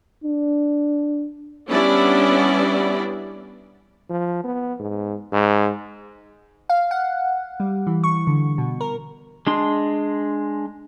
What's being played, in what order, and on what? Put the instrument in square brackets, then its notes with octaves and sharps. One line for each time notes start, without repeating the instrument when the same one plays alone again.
[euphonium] D4
[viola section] G3 B3 C#4 D4 E4 D5
[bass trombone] F3
B3
G#2
G#2
[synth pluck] F5
F#5
G3
E3
C#6
D3
B2
A#4
[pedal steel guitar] G#3 D4 C6